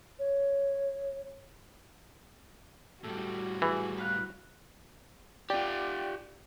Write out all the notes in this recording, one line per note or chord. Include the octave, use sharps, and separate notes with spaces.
C#5
A2 G3 F#4 A4
E3 G#4
B4 F5 F#6
F4 G4 D5 G5